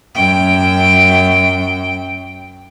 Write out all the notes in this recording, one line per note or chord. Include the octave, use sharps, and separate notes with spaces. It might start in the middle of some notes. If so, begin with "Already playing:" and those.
F#2 G5